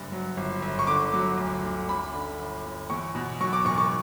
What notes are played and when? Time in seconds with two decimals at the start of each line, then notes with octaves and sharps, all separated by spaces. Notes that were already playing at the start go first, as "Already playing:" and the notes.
Already playing: F#1 G2
0.12 F#3
0.37 G1
0.62 G1
0.79 C#6
0.87 D3 D6
1.14 F#3
1.38 D2
1.63 D2
1.89 F#2 B5
2.13 D3
2.39 G1
2.65 G1
2.90 E2 C#6
3.15 B2
3.41 F#3 C#6
3.53 D6
3.65 E1 C#6
3.78 C#6